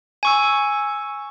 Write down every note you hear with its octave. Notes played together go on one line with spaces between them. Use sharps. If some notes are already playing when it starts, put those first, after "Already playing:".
G#5 C#6 E6